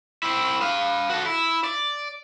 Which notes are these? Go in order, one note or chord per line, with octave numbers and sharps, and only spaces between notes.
C4 E4
B4 F5
F#4 A4
E4
D5